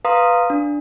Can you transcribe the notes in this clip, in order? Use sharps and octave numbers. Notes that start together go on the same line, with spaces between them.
B4 F5 A#5 C6 D#6
D4